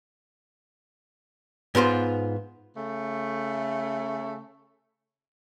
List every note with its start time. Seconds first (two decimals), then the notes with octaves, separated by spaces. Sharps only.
1.75 G#2 B3 F4 C5
2.77 C#3 A3